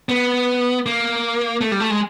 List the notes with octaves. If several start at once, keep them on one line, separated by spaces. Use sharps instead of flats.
B3
A#3
A3
G3
A3
G#3